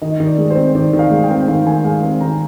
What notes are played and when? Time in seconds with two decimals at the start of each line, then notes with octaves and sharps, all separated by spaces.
0.02 D#3 D#5
0.20 D#3
0.26 D5
0.38 G#3
0.50 C5
0.56 C4
0.75 D#3 D5
0.93 D#3
0.99 F5
1.11 G#3
1.24 G5
1.30 C4
1.48 D#3 F5
1.66 D#3 G#5
1.84 G#3 F5
2.03 C4 C5
2.21 D#3 A#5